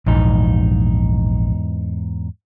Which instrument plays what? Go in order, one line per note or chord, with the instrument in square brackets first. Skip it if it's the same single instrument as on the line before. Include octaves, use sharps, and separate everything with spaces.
[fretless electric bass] A#1 [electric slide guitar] E2 G#2 D#4